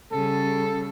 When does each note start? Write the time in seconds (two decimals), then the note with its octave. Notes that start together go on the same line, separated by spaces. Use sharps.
0.12 C#3 G3 A4